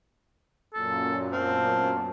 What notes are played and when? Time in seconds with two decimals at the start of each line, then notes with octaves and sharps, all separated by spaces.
0.74 F#2 A#2 A4
1.33 B3 C4 F5 A5